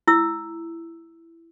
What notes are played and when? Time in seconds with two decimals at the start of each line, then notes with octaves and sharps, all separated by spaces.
0.07 E4 E6